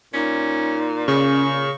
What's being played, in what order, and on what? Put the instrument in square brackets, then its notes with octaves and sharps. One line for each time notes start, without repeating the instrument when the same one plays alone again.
[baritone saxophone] A#2 [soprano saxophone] C#4 [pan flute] D#4
[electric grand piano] C#3 [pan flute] C#4 [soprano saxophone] C#6